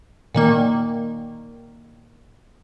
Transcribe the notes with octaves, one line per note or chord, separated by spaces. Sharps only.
A#2 D#3 A#3